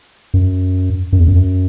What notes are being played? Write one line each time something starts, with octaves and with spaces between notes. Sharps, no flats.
F#2
F#2
E2
F#2